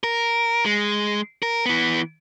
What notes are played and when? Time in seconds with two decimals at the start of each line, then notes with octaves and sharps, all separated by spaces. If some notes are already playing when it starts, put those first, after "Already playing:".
0.04 A#4
0.66 G#3
1.43 A#4
1.66 E3 B3